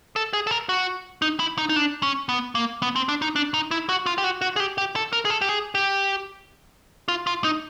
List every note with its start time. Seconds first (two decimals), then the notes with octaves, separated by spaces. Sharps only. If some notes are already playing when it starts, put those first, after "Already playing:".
0.16 A4
0.33 G#4
0.47 A4
0.51 A#4
0.69 F#4
1.22 D#4
1.39 E4
1.58 D#4
1.69 D#4
1.76 D4
2.03 C#4
2.29 B3
2.55 A#3
2.82 B3
2.96 C4
3.09 D4
3.22 D#4
3.36 D4
3.54 D#4
3.71 E4
3.89 F#4
4.06 F4
4.18 G4
4.24 F#4
4.41 F#4
4.56 G#4
4.60 G4
4.78 G4
4.96 A4
5.13 A#4
5.25 G#4
5.30 A4
5.41 G4
5.49 G#4
5.75 G4
7.08 F4
7.27 F4
7.44 D#4